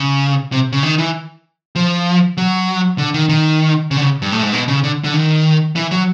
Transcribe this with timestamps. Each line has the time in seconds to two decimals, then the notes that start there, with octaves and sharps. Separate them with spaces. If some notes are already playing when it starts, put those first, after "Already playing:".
Already playing: C#3
0.52 C3
0.72 C#3
0.83 D#3
0.98 E3
1.76 F3
2.37 F#3
2.98 D3
3.14 D#3
3.29 D#3
3.91 C#3
3.97 D3
4.01 C#3
4.22 G2
4.32 A2
4.42 G#2
4.53 B2
4.68 C#3
4.84 D3
5.04 D3
5.14 D#3
5.76 E3
5.91 F#3